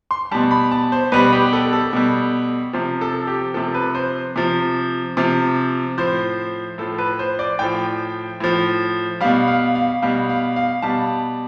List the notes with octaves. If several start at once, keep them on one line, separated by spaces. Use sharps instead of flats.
C6
B2 G3 A5
B5
A5
C5
B2 G3 B4
G4
A4
A4
B2 G3
C3 F3
A4
G4
C3 F3 A4
B4
C5
C3 F3
C3 F3
A2 F3 C5
A2 F3 A4
B4
C5
D5
A2 F3 G5
A2 F3
B2 G3 F5
F5
F5
B2 G3 F5
F5
F5
B2 G3 A5